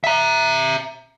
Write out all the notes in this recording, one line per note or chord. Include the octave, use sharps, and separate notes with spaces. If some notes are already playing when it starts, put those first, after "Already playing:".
E5 A#5